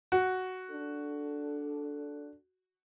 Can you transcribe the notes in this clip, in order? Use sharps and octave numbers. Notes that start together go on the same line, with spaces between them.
F#4
D4 A4